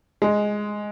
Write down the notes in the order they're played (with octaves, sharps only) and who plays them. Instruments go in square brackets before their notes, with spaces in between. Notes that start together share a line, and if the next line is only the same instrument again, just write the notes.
[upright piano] G#3